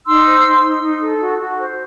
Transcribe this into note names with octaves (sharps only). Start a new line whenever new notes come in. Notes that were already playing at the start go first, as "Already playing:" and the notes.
D#4 C6 E6
C5
D#4
D#4
D#4
A4
F#4
F#4
C5